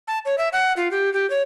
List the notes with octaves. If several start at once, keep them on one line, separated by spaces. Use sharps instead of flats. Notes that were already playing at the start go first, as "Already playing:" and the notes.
A5
C#5
E5
F#5
F4
G4
G4
C#5